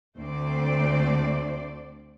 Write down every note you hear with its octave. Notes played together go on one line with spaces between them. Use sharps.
D2 A3 C4 C5 D5